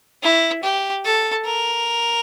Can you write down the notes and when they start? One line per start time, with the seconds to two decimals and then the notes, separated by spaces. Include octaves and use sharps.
0.23 E4
0.63 G4
1.05 A4
1.45 A#4